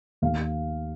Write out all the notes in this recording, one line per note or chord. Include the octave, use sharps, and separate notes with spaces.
D#2 F5